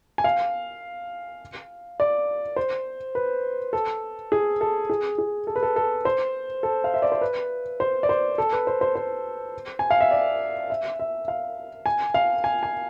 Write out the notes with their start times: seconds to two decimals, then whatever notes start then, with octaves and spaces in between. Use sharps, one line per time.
0.18 G#5
0.24 F5
2.00 D5
2.56 C5
3.15 B4
3.73 A4
4.32 G#4
4.61 A4
4.90 G#4
5.18 G#4
5.47 A4
5.56 B4
5.63 A4
5.76 A4
6.05 C5
6.63 A4
6.84 F5
6.94 E5
7.02 D5
7.12 C5
7.21 B4
7.80 C5
8.03 D5
8.09 C5
8.38 A4
8.53 B4
8.67 C5
8.81 C5
8.95 C5
9.79 G#5
9.90 F5
10.01 E5
10.11 D5
10.70 E5
11.00 E5
11.28 F5
11.86 G#5
12.14 F5
12.44 G#5
12.63 G#5